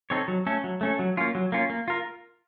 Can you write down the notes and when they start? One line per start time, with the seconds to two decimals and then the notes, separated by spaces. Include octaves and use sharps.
0.10 C4 D#4 A4 C#5
0.28 F#3
0.47 A3 C#4 A4
0.64 F#3
0.81 A3 C#4 A4
0.99 F#3
1.17 A#3 C#4 F4
1.35 F#3
1.52 A#3 C#4 F4
1.70 A#3
1.88 F4 A#4